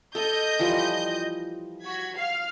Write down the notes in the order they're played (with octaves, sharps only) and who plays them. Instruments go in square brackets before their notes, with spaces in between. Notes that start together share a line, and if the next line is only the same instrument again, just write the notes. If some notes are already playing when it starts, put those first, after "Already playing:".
[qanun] A4 [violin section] D#5 G6
[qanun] E3 F3 G3
[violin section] F#4 G#6 B6
F5 F6 C7